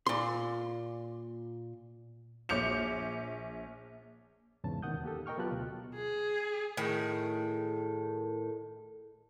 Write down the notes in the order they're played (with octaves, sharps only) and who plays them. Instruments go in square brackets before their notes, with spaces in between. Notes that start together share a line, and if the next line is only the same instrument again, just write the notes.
[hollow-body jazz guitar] A#2 C6
[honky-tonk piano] A#1 C#5 D6 G6 C#7 F7
[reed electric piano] E2 G#2 C#3 A5
D#2 B2 D#3 F#5 D#6 G6
A#3 G4 A4
A#4 D#5 G5 C#6 F6
F#3 B3 F4 G4 A5 F#6
D2 B2
[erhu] G#4
[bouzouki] A2 D#3 G#4